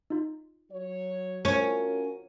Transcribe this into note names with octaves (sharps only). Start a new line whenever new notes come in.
D#4 F4
F#3 C#5
A3 C#4 F4 F#4 A#4 C5